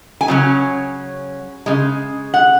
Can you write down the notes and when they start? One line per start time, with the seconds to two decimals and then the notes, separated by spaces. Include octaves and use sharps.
0.21 G#5
0.28 C#3 F#3 C#4
1.66 C#3 G#3
2.34 F#5